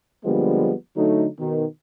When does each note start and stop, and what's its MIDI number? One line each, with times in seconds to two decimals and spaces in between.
0.25 0.72 50
0.25 0.72 53
0.25 0.72 55
0.25 0.72 56
0.25 0.72 58
0.25 0.72 59
0.97 1.26 50
0.97 1.26 54
0.97 1.26 57
0.97 1.26 63
1.39 1.65 47
1.39 1.65 51